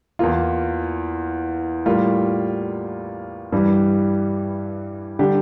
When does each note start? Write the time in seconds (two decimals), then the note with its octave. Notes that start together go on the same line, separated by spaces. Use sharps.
0.19 E2 E3 A#3 F4
1.86 A2 G3 A#3 F4
3.52 G2 E3 G3
5.19 D3 G3 D4 G4